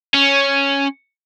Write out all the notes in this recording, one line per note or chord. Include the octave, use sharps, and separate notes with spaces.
C#4